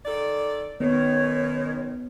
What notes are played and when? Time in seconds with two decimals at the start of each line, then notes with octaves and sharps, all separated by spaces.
0.04 D#3 A4 D5
0.80 F#2 B2 D#3 B3 C#5